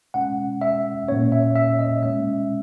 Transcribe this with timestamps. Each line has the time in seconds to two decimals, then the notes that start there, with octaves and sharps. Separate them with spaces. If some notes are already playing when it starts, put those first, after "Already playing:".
0.14 B2 G#3 C#4 F#5
0.61 E5
1.08 A#2 A#3 C#4 C#5
1.32 E5
1.55 E5
1.79 D#5
2.02 B2 G#3 C#4 E5